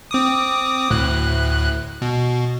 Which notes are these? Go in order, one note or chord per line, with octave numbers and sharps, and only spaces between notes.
C4 D6 D#6
D2 A2 F#6
B2